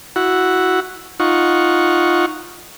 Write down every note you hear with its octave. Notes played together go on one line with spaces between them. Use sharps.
E4 F#4 F#5
D#4 F4 F#5 C#6